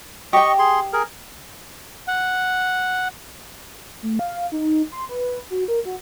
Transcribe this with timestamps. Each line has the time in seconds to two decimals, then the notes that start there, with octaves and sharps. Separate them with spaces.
0.33 G4 D#5 G5 C#6
0.59 G#4 C6
0.93 G#4 A#4
2.08 F#5
4.03 A3
4.19 F5
4.52 D#4
4.92 C6
5.09 B4
5.50 F#4
5.68 A#4
5.85 F#4